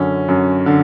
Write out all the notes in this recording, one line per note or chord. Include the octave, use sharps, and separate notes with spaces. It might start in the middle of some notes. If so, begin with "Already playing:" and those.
Already playing: F#2 D3 C#4
F#2
D3